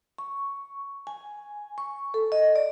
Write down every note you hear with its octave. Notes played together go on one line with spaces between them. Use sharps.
C#6
G#5
C#6
A4
D#5
D5